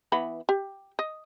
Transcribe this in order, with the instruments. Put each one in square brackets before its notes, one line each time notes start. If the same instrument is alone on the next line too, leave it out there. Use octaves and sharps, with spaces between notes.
[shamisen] E3 B3 B5
G4
D#5